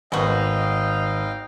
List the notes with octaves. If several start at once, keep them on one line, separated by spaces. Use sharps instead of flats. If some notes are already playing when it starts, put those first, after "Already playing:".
G#1 G#3 B3 F#4 D#5 F5 G5